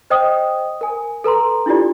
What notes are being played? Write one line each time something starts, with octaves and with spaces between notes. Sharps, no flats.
C5 D#5 G5 D#6
A#4 G#5
A4 B4 A#5 C6
D4 E4 F4 G4 D5